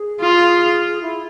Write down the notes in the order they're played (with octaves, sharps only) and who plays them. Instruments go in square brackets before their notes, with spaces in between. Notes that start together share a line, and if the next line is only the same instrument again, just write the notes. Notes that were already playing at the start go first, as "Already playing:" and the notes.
Already playing: [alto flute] G#4
[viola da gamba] F4
[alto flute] E4